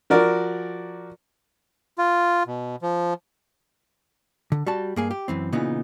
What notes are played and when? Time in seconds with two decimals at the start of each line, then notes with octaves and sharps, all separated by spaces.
0.10 F3 F#4 A#4 D5
1.98 F4
2.47 B2
2.82 F3
4.52 D3
4.66 G3 F#4 A5
4.96 G2 A#3 G#4
5.11 G4
5.28 F#2 E3 C4
5.53 A#2 C#3 E3 B3 D#4